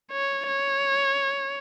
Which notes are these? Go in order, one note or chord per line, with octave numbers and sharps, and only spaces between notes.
C#5
C#5